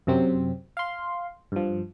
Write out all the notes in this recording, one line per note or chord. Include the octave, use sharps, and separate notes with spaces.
F#2 C3 F#3 C4
F5 C6
G2 F3